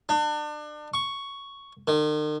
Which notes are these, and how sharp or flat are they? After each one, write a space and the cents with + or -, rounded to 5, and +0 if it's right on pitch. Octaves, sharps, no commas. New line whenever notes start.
D4 +35
C#6 +5
D#3 -45